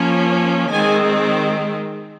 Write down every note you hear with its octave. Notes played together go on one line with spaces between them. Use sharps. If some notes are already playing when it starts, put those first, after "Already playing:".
Already playing: F3 A#3 C#4
D#3 G#3 C4 G#5